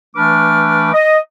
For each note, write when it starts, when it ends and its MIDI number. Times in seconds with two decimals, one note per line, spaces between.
0.16 0.91 52
0.16 0.91 57
0.16 0.91 62
0.16 0.91 71
0.16 0.91 86
0.16 0.91 89
0.94 1.18 75